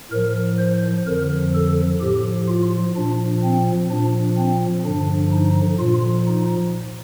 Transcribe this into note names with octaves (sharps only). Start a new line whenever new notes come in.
A2 F3 A#4
C5
F2 D3 F3 A#4
A4
A2 F3 G4
F4
A#2 F3 D4
C4
A#2 F3 D4
C4
G2 D3 F3 D4
D#4
A#2 F3 F4
D#4